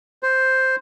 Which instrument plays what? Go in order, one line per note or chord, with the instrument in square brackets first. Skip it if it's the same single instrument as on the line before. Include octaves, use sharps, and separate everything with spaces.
[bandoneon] C5